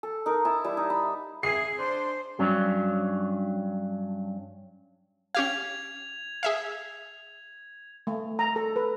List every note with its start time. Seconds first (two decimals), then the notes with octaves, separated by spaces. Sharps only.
0.03 A4
0.26 D#4 A#4
0.45 E4 A5
0.64 G3 E4
0.77 D#4
0.90 B5
1.43 G#4 E5 C7
1.79 D4 C5 C6
2.39 G2 F#3 C#4 D4
5.35 C#4 G4 F5 G#6 F7
6.43 G#4 E5 F5
8.07 A3
8.39 A#5
8.56 A4
8.76 B4